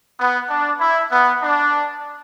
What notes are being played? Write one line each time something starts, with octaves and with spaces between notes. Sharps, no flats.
B3
D4
E4
B3
D4